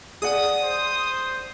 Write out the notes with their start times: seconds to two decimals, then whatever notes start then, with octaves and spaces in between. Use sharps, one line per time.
0.22 G#4 D5 F#5 D#6
0.63 C5